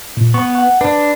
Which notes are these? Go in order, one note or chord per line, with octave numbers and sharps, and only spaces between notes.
A#2
B3 C#6
F#5
D4 B4